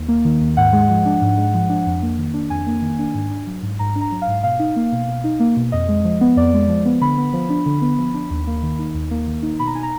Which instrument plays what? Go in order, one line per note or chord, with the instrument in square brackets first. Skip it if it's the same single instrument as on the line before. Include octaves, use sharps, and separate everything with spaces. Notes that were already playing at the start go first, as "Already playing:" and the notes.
Already playing: [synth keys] D#2
A#3
D#3
D#2
G#2 F#5
G#3
F3
D4
G#2
G#3
F3
D4
F2
A#3
D#3
D4
F2 G#5
A#3
D#3
D4
G#2
D4
F#3
G#2
G#2 A#5
D4
A#5
F#3
F5
G#2
B2 F5
D#4
A#3
B2
B2
D#4
A#3
B2
F2 D#5
G#3
F3
B3
F2 D5
G#3
F3
B3
D3 B5
B3
F3
D4
D3
B3
F3
D4
D#2
A#3
D#3
D#4
D#2
A#3
D#3
D#4
B2 B5
A#5
D#4 G#5
A#5